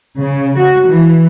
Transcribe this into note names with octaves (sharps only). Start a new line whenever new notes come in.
C#3
F#4
E3